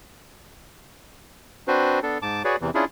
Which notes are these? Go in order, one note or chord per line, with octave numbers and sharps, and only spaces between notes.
C4 D4 F#4 B4 C5
B3 D4 A4
G#2 A5 D6
F#4 G#4 B4 C#5 D5
E2 C3 E3
C#4 D4 E4 F4 G#4